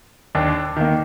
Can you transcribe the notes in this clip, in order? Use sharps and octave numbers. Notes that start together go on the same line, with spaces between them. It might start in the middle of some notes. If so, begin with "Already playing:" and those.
D#2 D4
D#3 A#3